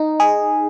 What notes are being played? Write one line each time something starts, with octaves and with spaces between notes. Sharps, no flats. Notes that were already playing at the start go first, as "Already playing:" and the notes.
Already playing: D#4
G#4